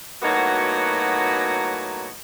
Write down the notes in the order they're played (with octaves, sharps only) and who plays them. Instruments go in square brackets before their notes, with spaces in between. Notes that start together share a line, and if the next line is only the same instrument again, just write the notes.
[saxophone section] A2 F#3 A#3 B3 D#4 F#4